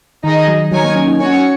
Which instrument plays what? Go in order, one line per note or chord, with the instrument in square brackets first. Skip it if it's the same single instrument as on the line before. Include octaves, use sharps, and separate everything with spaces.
[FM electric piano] D#3 [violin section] D#4 G#4 D#5
[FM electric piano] F#3
[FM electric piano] F#3 [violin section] D#4 A#4 C#5 G#5
[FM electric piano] A#3
C#4
D#4
[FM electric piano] C#4 [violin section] F#4 C#5 G#5